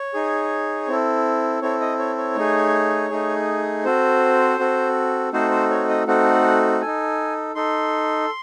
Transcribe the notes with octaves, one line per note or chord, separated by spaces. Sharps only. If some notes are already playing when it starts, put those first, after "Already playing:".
Already playing: C#5
D#4 G#4
C4 E4 A4
C4 E4 A4 C#5
D#5
C#5
C#5
A3 D#4 G#4
A3 D#4 G#4
C4 F#4 A4 C5
C4 F#4 A4
A3 C4 D#4 F#4 A4 C5
C5
C#5
D#5
A3 C4 D#4 F#4 A4 F#5
D#4 A4 G#5
D#4 A4 C6